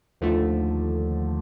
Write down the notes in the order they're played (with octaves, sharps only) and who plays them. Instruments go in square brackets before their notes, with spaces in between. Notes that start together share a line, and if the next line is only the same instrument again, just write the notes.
[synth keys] D#2 D3 F3 A3